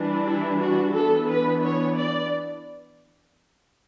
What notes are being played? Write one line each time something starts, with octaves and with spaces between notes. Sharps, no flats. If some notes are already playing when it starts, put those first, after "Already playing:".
Already playing: E3 G3 D4
E4
F#4
E3 B3 D4 A4
B4
C#5
D5